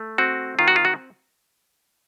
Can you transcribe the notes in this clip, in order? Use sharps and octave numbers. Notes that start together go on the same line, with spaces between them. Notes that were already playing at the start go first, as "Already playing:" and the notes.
Already playing: A3
C4 F#4
D#3 F4
F#4
F4
F#4